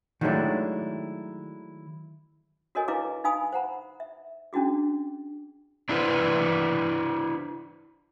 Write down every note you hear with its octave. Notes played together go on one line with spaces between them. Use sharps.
D#3 F#3 G#3 A3 D4 E4
F#4 A4 A#4 C#5 D#5 G#5
E4 B4 D#5 F5 A#5 D6
D#4 B4 F5 G#5 B5 D#6
C5 F#5 A#5 B5
E5
C#4 D4 E4 F#4 G#4
D4 E4 G4 A4 B4 C5